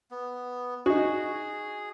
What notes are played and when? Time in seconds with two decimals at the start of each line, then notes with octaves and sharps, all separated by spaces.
0.11 B3
0.86 D#4 F#4 G#4